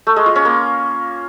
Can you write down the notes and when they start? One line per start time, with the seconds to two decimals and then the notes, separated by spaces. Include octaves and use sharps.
0.07 A3
0.16 G#3
0.26 F4
0.36 C#4
0.45 A#3